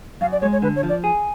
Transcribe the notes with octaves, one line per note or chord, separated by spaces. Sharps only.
F#2 F5
D5
G#3 C#5
C#5
D3 B4
C#5
F3
D5
G#4